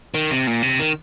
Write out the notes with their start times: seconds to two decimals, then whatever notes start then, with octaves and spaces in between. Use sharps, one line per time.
0.14 D#3
0.31 C3
0.47 A#2
0.63 C3
0.79 D#3